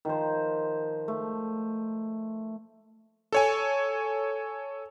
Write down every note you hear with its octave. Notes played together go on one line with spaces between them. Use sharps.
D#3 F3 C5
A3
A4 C#5 G#5